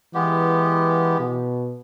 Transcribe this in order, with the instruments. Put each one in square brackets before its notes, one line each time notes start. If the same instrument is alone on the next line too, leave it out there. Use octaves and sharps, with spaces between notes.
[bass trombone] E3 [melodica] G#3 B3 G4
[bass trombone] B2